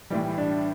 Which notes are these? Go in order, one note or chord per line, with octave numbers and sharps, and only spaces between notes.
A2 E3 G3 G4
D4